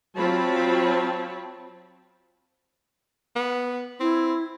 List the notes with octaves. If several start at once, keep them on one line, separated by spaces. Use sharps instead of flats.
F#3 C4 F4 C#5 A5 B5
B3
C4 E4